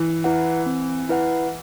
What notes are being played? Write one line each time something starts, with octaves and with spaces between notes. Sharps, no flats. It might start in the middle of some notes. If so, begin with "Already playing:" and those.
Already playing: E3
E4 B4 F#5
C4
E4 B4 F#5